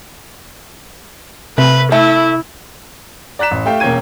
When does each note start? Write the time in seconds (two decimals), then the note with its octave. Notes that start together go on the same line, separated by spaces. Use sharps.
1.58 C3 A3 B4
1.92 A3 E4
3.39 D5 A#5 F#6 B6 E7
3.51 A1
3.66 A3 G4 F5 G5
3.80 E1 A#3 C#4 G5 G#6 D#7